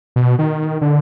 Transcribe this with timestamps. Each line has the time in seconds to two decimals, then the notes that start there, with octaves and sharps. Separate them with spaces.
0.16 B2
0.39 D#3
0.81 D3